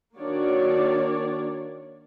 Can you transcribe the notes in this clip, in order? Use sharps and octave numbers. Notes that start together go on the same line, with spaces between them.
D#3 A#3 D4 F#4 C#5 D5